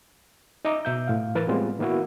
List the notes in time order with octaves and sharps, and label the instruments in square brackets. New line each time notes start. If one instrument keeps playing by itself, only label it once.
[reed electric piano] D#4 D#5 E5 A#5 D6
B2 E5 G6
A2 F5
E3 A#4 B4 A#5 A6
A2 G3 G#3 B3 C4 F4
D#3 A#3 B3 E4 F#4